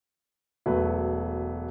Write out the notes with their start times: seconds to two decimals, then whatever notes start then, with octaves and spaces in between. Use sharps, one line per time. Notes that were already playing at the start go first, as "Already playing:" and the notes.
0.66 E1 F#3 A3 B4